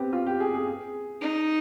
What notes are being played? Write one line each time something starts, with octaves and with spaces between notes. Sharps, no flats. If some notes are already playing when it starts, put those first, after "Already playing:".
Already playing: B3 C4 G4
F4
G4
G#4
G#4
G#4
D#4